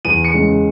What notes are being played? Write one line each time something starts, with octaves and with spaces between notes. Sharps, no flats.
E2 D#7
C#7
C#3 G#3